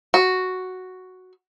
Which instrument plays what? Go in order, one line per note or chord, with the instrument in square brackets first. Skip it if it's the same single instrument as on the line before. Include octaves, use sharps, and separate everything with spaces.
[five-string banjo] F#4